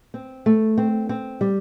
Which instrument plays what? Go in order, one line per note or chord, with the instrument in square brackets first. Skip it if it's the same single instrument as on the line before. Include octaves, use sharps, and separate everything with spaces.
[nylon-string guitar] C4
A3
C4
C4
G3